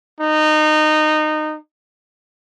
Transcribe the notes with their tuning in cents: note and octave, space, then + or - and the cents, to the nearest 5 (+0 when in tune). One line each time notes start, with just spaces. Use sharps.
D#4 -20